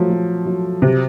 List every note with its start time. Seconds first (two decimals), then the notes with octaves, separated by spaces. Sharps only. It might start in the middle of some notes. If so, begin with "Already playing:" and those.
Already playing: F3 F#3 A3
0.10 F#3
0.46 F#3
0.82 C3 C4